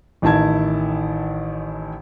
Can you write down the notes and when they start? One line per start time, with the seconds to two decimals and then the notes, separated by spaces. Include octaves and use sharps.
0.22 A1 D#3 E4 A5 G#6